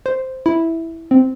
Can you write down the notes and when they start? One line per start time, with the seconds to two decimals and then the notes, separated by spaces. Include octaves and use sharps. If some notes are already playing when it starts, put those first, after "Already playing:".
0.06 C5
0.46 E4
1.11 C4